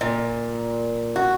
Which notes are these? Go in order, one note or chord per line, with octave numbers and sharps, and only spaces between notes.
A#2
F#4